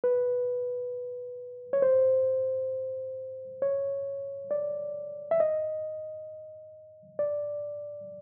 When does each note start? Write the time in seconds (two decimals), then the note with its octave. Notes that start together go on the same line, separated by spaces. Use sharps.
0.04 B4
1.73 C#5
1.82 C5
3.62 C#5
4.51 D5
5.31 E5
5.40 D#5
7.19 D5